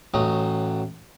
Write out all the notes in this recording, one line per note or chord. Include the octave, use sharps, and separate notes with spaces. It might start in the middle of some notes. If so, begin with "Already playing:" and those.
A1 F#3 D#5